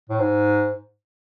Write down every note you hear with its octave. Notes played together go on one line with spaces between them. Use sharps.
A2
G#2